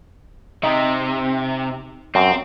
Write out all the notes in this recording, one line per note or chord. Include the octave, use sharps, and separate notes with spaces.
C3 D#4
F#2 C4